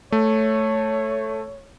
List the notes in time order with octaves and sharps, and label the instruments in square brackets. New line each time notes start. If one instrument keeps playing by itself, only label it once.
[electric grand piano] A3 [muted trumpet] C#5